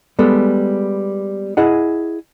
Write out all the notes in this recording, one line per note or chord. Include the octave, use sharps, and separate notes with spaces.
G3 G#3 B3 A4
E4 G#4 D#5 F#5